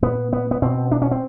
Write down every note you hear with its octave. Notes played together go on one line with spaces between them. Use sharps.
A#2 B3
B3
B3
B2 C4
D4
C#4
C4